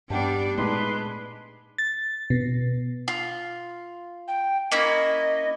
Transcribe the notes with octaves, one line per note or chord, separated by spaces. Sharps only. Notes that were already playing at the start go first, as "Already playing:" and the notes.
G2 G3 B3 D4 F#5 G5 A5
A#2 G#3 A3 D#4 B4 A5 C6 D6
A6
B2
F4
G5
A#3 C#4 E4 D#5